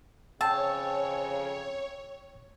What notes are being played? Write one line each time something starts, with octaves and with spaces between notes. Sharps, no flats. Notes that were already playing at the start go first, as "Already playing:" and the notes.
F2 C#3 C#5 G5 A5 E6